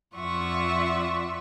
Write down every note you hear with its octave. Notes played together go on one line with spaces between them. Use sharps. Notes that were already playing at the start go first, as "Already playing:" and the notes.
F2 F4 D5 E5 F#5 C#6